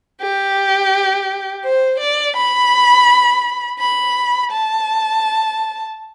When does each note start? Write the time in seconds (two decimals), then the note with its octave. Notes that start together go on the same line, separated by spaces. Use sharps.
0.21 G4
1.64 C5
2.00 D5
2.37 B5
3.79 B5
4.51 A5